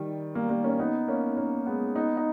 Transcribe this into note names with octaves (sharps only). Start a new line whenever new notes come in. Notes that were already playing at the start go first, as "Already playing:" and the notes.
Already playing: D#3 G3
G3 A#3
G3 A#3
A#3 C#4
B3 D#4
A#3 C#4
A#3 C#4
G#3 B3
B3 D#4
D#4